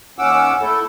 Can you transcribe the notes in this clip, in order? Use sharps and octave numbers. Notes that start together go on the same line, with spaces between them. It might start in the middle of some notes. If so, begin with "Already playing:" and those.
D#2 C#4 F#5 D6 E6
A3 E4 A4